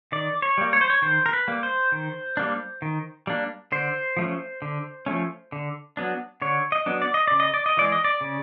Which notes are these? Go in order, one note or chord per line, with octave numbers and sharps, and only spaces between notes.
D#3 D5
C#5
G3 A#3
C#5
C5
C#5
D#3 C5
A#4
B4
G3 A#3
C5
D#3
G3 A#3 D4
D#3
G3 A#3 D4
D3 C5
F3 A3 C#4
D3
F3 A3 C#4
D3
F#3 B3 D4
D3 C#5
D#5
F#3 B3 D4
D5
D#5
C#3 D5
D#5
D5
D#5
E3 G#3 D5
D#5
D5
C#3